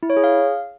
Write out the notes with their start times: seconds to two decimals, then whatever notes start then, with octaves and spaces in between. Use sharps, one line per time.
0.03 E4
0.10 C#5
0.17 G#4
0.24 F5